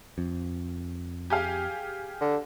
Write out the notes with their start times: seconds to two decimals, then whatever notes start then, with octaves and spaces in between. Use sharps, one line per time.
0.18 F2
1.30 G4 G#4 F5
2.21 D3